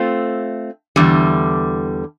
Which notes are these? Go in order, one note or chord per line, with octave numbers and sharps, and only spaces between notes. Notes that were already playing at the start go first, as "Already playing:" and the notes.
Already playing: A3 C4 F4
E2 D3 G3